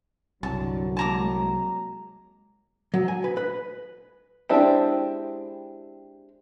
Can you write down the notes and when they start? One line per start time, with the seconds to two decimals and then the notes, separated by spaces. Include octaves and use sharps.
0.43 C2 G2 D3 F#3 A5
0.97 G#3 A#3 A5 A#5 D6
2.94 F#3
3.08 G#5
3.24 B4
3.37 B4
4.49 G#3 C4 D4 E4 G4